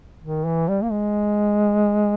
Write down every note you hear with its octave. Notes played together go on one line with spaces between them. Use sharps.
D#3
E3
G3
A#3
G#3